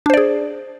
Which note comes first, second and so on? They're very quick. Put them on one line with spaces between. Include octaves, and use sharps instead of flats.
D4 C5 D5 G#4